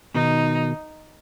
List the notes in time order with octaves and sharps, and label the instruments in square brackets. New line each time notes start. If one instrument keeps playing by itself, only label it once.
[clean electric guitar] B2 D#3 [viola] D#4